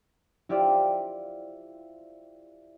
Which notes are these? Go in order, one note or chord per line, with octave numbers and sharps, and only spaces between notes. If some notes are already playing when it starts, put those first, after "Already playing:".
E4 F4 G4 C5 D5